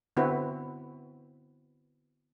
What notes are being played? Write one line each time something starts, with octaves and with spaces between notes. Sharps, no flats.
D3 B3 C4 E4 F#4 B4